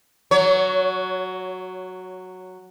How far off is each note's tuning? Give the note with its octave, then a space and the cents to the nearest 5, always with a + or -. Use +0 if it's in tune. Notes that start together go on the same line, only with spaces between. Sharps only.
F#3 +0 C#5 +20